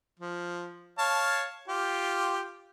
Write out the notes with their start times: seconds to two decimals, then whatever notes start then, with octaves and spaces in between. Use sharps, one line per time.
0.20 F3
0.98 C#5 F5 A5
1.68 F4 G4